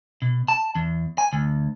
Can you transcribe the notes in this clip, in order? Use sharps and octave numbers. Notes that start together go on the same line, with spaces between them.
B2
A5
E2
G#5
D2